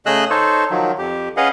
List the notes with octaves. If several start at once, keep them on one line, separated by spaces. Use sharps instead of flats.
C#3 A3 G#4 D#5 E6 F#6
D#4 A4 C5 C#5
D#3 F3 F#3
F2 G4
C#4 G#4 B4 D#5 F5 F#5